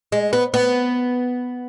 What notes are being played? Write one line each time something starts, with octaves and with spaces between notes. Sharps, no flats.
G#3
B3
B3